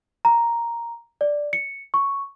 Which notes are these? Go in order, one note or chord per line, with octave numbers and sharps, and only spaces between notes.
A#5
D5
C#7
C#6